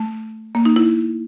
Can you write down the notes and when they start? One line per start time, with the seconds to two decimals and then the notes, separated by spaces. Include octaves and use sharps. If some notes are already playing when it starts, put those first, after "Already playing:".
Already playing: A3
0.55 A#3
0.65 D#4
0.76 E4